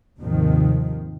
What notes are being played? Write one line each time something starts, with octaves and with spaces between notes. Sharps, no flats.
D#2 G#2 C3 D#3 F3